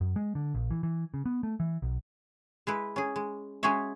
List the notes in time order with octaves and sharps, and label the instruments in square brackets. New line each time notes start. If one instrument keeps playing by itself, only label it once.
[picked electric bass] F#2
G#3
D3
A#1
E3
E3
C#3
B3
A3
E3
B1
[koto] G#3 E4 B4
C#4 G#4
G#3
G#3 C#4 F#4 G#4 C#5 E5